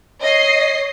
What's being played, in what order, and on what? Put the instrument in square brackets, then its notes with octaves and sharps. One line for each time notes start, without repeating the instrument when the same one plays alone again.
[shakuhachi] C#5 [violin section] D#5 C7